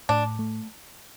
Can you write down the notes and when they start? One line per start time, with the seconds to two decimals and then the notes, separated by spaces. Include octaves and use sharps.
0.09 A2 D4
0.39 A3